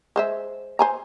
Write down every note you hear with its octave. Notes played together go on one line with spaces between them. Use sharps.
G#3 C5 E5
C5 G#5 A#5